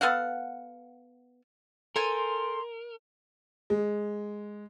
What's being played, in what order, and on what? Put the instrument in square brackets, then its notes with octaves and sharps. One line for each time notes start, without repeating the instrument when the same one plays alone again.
[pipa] B3 A4 F5 F#5
[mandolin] A4 C5 G#5 [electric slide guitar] A#4 [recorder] C6
[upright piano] G#3